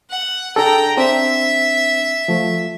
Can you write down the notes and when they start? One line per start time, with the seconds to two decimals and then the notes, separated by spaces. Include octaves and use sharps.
0.10 F#5
0.56 D4 G#4 A4 G5 A#5
0.97 C4 D4 E5
2.28 F3 A3